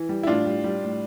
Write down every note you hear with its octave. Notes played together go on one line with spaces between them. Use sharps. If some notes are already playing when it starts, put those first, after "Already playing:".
Already playing: E3
G3
E4
A2 D4 F4
G3
G3
A2